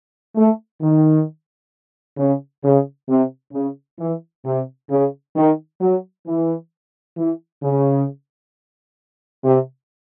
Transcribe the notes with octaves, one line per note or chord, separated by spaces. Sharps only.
A3
D#3
C#3
C#3
C3
C#3
E3
C3
C#3
D#3
F#3
E3
E3
C#3
C3